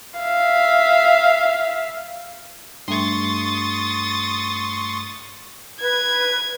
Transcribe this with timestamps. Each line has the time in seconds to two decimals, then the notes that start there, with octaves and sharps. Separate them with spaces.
0.20 E5 F5
2.88 G2 A3 C6 C#6 D#6 A6
5.81 B4 G#6